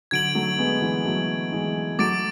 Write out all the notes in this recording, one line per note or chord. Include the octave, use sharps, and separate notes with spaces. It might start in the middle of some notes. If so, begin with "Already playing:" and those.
D3 F#3 G#6 D7 F#7
F#3 A3
G#3 B3
E3 G#3
F#3 A3
E3 G#3
F#3 A3 D6 A6 D7